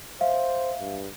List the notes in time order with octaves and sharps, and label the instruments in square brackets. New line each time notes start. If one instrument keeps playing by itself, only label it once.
[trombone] C5 [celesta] E5 F5
[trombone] G2